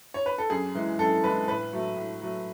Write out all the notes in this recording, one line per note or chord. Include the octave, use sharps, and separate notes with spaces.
C#5
B4
A4
F#2 G#4
E3 G#3
F#2 A4
E3 G#3 B4
A2 B4
F#3 A3
A2
F#3 A3